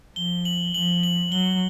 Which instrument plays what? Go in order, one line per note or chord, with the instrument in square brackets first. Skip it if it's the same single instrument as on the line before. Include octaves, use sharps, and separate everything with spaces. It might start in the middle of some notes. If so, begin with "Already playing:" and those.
[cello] F3 [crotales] G7
[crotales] F#7
[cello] F3 [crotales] F#7
[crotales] F#7
[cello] F#3 [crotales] G7